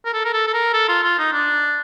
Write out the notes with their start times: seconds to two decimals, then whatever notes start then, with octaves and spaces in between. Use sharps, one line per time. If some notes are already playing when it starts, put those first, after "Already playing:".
0.05 A#4
0.14 A4
0.25 A#4
0.33 A4
0.47 A4
0.54 A#4
0.74 A4
0.89 F4
1.04 F4
1.19 D#4
1.33 D4